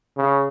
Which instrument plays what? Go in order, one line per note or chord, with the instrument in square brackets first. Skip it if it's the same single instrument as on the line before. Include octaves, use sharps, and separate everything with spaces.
[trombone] C#3